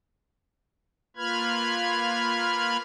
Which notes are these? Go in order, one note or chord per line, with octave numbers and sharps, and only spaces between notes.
A#3 F4 B4 B5 F6 G#6